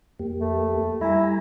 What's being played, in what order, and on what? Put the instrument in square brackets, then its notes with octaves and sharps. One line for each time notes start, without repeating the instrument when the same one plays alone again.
[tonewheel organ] F2 A#3 G4
[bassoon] A3
[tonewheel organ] G3 G#5 A#5 [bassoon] E4